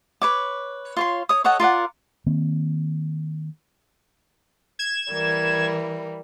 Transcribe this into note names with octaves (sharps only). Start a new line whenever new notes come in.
B4 C#5 D6
F4 C#5 C6
C#5 D#6
A4 C#5 D#5 F#5
F4 A#4 D5 F#5
D#3 A#3 C4
G#6 E7
E3 G3 A#3